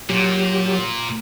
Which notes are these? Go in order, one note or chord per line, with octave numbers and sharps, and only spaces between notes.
A#2 F#3 G4